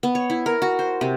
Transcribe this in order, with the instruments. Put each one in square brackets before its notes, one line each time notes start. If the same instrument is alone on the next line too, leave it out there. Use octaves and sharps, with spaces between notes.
[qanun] B3
C#5
E4
A#4
F#4
C5
C3